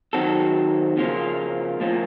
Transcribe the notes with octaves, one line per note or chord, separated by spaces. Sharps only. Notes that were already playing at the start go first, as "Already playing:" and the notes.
D#3 F#3 C4 F#4 A4
C#3 F3 A#3 C#4 F4
A2 F3 A#3 C#4